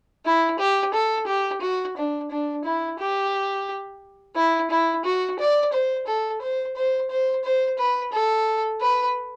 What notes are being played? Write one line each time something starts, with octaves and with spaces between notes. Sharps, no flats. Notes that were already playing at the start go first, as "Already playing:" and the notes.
E4
G4
A4
G4
F#4
D4
D4
E4
G4
E4
E4
F#4
D5
C5
A4
C5
C5
C5
C5
B4
A4
B4